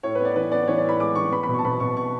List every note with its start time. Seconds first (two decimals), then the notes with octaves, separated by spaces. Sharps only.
0.03 A2 C#5
0.15 B3 B4
0.25 D5
0.36 E3 B4
0.52 B3 D5
0.67 E3 C#5
0.78 D5
0.84 A2 B5
1.00 G#3 D6
1.15 E3 C#6
1.32 B3 B5
1.43 B5
1.49 B2
1.54 A5 C#6
1.65 B2 B5
1.80 B2 C#6
1.97 C#6